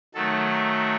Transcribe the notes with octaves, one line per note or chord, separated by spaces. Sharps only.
D#3 F#3 A3 A4